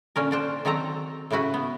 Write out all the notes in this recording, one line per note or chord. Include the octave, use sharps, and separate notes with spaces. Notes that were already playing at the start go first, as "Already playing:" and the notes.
A#2 D3 C#4 A#4
D3 D4 C5
D#3 F#3 C4 A4 A#5
A2 C#3 E4 F#4 B4
B3